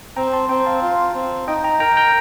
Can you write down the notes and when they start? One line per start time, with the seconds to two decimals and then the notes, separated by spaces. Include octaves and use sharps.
0.16 C4 G5 A#5
0.33 A5 C6
0.49 C4 G5 A#5
0.66 F5 A5
0.82 F4
1.15 C4
1.48 D#4 D#5 G5
1.64 G5 A#5
1.80 A#4 G5 A#5
1.97 G5 A#5